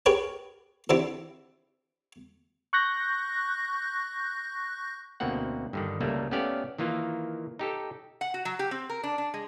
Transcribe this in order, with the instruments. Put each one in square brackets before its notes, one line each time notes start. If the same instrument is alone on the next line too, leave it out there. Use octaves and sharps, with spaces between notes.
[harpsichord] G4 G#4 A#4 B4 C#5
D#3 E3 C4 D4 E4 G4
[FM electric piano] C#6 F#6 G6 A#6
[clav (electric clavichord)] D2 B2 A#3 C4 F#5
G2 D3 D#3
C#2 G3 A3 A#3
A3 B3 C#4 G4 D5 F5
D#3 E3 A#3 F4
D#4 G4 A4
[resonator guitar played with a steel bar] F#5
F#4
F#3
G4
C4
A#4
D4
D4
G#3